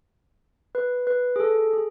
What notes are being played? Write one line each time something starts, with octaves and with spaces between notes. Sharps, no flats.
B4
B4
G#4
A4
G#4